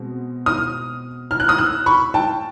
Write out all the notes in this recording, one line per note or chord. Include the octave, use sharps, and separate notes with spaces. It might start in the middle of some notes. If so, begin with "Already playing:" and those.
Already playing: B2 G#3 C4
D#6 F6
F6
F#6
D#6 F6
E6 F#6
B5 C#6
G5 A5